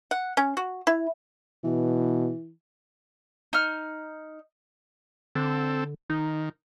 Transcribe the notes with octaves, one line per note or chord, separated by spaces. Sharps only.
F#5
C#4
F#4
E4
B2 E3
D#4 F6
D3 C4 A4
D#3 D#4